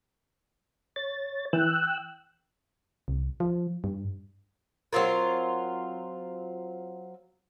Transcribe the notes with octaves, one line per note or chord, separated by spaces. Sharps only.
C#5 A6
E3 G5 E6 F#6
C2
F3
G2
F#3 C4 F4 A#4